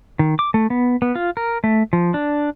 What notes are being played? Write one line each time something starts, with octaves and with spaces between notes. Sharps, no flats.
D#3
D6
A3
B3
B3
F4
A#4
A3
F3
D4